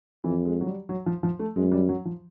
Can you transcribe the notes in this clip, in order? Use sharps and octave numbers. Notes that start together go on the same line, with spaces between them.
F2 E3
G#3
F#3
G3
F#3
F3
F3
A3
F#2 G#3
G3
F#3
F3